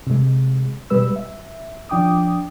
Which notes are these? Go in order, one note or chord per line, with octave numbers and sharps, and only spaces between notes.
C3 G#3
B2 G3 G#3 B4 E6
E5
F3 D4 G5 D6 D#6